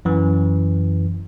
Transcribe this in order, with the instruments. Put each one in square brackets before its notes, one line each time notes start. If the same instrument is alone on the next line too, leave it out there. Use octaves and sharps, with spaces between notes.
[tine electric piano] F#2 E3